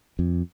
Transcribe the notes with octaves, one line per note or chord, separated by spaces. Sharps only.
F2